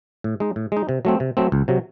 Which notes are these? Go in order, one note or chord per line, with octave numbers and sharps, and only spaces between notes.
A2
G#3 D#4
A2
G#3 D#4
C3
F#3 A3 C4
C3
F#3 A3 C4
C#2
C3 F#3